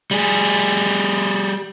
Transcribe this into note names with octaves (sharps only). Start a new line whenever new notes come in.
G3 G#4